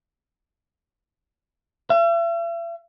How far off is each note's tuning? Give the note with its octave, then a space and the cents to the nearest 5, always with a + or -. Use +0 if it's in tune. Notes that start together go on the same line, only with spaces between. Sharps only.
E5 +45